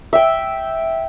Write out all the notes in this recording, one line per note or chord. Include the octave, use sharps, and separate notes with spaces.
E5 G5